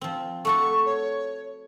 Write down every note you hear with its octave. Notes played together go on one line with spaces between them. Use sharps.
F3 C4
A3 F#4 A4 C#6
C#5